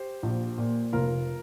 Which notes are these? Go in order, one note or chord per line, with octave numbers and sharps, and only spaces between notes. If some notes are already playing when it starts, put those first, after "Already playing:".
Already playing: G4 C5
A#1
A#2
F1 F4 A#4